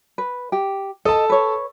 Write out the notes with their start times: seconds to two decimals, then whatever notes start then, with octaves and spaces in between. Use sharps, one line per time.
0.18 B4
0.52 G4
1.05 A4 D#5 A5
1.30 B4 C#5